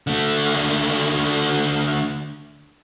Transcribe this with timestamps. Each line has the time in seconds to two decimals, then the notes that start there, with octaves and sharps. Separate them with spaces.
0.07 D3 A3